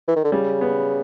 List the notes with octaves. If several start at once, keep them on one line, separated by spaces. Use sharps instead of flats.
E3
D#3
D3
C#3 G3
B3